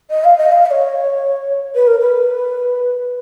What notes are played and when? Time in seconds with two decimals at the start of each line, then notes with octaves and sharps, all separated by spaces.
0.10 D#5
0.24 F5
0.38 D#5
0.52 F5
0.66 D#5
0.71 C#5
1.75 B4
1.87 A#4
2.00 B4